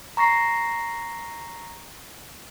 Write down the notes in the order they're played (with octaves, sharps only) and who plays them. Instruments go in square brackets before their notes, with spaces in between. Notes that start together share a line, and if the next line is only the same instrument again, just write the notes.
[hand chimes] A#5 C#6 A#6 C7